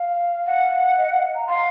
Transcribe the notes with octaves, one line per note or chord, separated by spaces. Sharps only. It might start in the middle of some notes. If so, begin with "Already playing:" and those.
Already playing: F5
F#5
D#5
F5
A#5
F5 C6